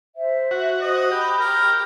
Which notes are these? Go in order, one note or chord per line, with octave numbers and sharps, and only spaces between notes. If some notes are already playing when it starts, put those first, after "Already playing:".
C5 E5
F#4
C5 D#5
G4 B5
A#4